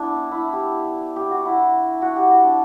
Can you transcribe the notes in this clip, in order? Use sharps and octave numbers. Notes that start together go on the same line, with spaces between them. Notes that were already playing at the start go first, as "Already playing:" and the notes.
Already playing: B3 D4 E4
E4
G4
G4
F#4
E4
F#4
G4
F#4
D4